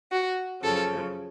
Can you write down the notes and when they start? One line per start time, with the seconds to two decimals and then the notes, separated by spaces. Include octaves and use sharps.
0.11 F#4
0.62 F#2 C#3 F3 A4